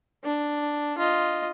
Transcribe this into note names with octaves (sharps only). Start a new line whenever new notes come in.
D4
F4 D#5